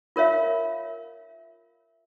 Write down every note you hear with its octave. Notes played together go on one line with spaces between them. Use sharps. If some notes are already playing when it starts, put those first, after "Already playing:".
F4 A#4 C#5 E5 F5